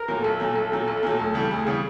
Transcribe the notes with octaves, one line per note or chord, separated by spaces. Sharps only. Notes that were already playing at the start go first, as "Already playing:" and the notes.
Already playing: A#4
A#2 F#3
B1 A4
A#2 F#3
B1
A#2 F#3
B1
A#2 F#3
D2
C#3 E3 G3
D2 G#4
C#3 E3 G3